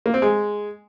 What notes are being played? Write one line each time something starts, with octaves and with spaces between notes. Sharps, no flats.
A#3
C4
G#3